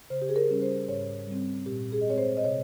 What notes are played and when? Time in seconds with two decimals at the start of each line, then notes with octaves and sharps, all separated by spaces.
0.10 C#3 C5
0.22 G4
0.29 G#4
0.36 A#4
0.49 G3 C#4
0.62 C5
0.88 G#2 C#5
1.27 G3 C4
1.66 A#2 G4
1.92 G#4
2.01 D#5
2.06 G#3 C4 C#5
2.18 C5
2.37 D#5
2.44 C3 C#5